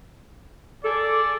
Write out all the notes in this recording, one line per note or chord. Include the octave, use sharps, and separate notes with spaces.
G#4 A4 D5